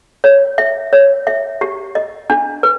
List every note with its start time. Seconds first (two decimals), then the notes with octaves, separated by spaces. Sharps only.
0.24 C#5
0.58 E5
0.93 C#5
1.27 E5
1.61 G4
1.95 D#5
2.30 D4
2.63 B4